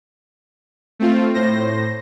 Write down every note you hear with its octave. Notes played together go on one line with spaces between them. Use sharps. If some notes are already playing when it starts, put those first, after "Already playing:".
A3 C4 F4
A2 C5 A#6